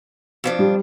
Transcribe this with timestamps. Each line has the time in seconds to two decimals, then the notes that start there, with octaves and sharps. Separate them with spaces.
0.44 F2 F3 D4
0.59 G3